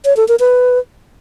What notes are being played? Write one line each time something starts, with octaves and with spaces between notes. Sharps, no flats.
C#5
A4
A#4
B4